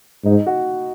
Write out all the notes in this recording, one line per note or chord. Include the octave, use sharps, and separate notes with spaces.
G#2 D#4
F#4